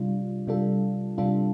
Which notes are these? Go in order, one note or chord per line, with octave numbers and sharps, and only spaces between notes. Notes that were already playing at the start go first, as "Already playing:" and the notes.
Already playing: C3 G3 D4 F4
C3 G3 D4 F4 A4
C3 G3 D4 F4 A4